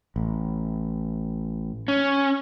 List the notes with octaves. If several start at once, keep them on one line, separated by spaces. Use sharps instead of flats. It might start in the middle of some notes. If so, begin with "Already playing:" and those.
A1
C#4